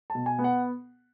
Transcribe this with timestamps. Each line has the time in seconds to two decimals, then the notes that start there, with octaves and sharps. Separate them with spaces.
0.10 A5
0.15 B2
0.26 G#5
0.39 B3
0.44 F#5